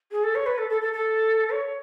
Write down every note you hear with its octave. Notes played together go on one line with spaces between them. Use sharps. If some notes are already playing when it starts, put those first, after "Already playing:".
G#4
A4
C#5
B4
A4
A4
A4
A4
C#5